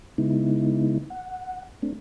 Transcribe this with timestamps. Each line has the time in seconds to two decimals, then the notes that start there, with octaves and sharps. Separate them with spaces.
0.18 C#3 G#3 B3 D#4 E4
1.10 F#5
1.82 A3 C4 D4